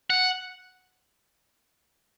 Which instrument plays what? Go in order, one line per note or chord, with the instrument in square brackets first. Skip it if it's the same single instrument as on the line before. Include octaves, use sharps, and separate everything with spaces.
[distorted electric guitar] F#5